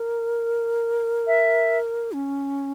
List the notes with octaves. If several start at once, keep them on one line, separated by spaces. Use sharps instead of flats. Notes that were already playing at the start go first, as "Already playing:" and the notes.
Already playing: A#4
E5
C#4